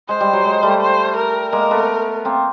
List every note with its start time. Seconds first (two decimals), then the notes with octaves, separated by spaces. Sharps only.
0.09 G#3 C5
0.20 G3
0.33 F#3
0.45 G#3
0.63 G3 A3
0.81 C5
1.17 A#4
1.53 G#3 A#3 A#4
1.71 A3 B3
2.25 A#3 C4